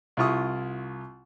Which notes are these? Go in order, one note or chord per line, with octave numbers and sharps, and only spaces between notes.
C2 E4 F4 C#6 D#6